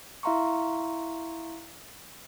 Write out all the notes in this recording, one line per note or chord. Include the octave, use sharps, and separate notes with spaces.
E4 E5 F5 A#5 C6 C#6